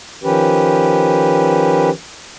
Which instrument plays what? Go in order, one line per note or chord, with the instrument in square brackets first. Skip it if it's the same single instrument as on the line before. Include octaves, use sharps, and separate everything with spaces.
[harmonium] D#3 F3 C#4 G4 B4